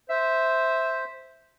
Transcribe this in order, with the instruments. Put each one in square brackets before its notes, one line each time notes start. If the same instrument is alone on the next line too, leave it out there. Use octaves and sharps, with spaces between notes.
[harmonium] C5 [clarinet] E5